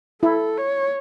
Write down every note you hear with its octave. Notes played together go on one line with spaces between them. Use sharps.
E4 A4
C#5